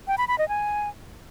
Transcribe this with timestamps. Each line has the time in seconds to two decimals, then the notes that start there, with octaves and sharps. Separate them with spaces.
0.08 G5
0.18 B5
0.28 B5
0.38 D#5
0.49 G#5